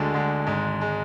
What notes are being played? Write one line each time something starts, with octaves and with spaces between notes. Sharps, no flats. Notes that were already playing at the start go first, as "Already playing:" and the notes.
Already playing: D2 D3 G#3 D4
D2 D3 G#3 D4
G#1 G#2 G#3
G#3